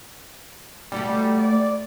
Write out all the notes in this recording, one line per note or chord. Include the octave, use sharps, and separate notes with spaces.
G3 A3 F#4 G4
D5